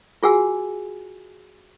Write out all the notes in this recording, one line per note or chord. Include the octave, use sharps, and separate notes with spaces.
F4 F#4 G#4 F#5 G#5 E6